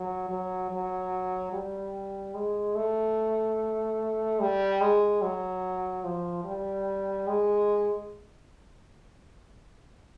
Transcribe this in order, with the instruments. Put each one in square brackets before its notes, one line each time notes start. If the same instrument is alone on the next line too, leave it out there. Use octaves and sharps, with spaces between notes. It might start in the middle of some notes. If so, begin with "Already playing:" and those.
Already playing: [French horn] F#3
F#3
F#3
G3
G#3
A3
G3
G#3
F#3
F3
G3
G#3